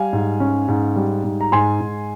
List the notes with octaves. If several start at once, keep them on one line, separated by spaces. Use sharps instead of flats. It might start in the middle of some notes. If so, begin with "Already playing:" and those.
Already playing: G3 F5 G#5
G#2
C#4
G#2
G3
G#2
A#5
G#2 G#5 C6
G#2